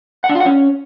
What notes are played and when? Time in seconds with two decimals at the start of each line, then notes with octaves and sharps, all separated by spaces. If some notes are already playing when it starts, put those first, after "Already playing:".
0.24 F#5
0.29 D4
0.35 F4
0.40 F#5
0.46 C#4